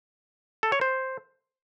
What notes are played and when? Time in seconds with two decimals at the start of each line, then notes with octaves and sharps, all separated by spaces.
0.63 A4
0.72 C#5
0.81 C5